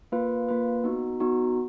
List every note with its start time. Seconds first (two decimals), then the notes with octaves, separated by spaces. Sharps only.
0.12 A#3 F4 B4
0.48 A#3 F4 B4
0.84 B3 D#4 F#4
1.20 B3 D#4 F#4